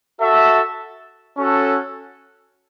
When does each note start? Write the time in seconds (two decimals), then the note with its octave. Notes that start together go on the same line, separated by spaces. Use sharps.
0.20 F#4 A4 E5
1.37 C#4 F#4 A4